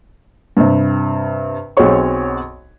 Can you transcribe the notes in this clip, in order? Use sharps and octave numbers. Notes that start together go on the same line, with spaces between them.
G2 C3
B1 C4 F#4 G#4 C#5 C#6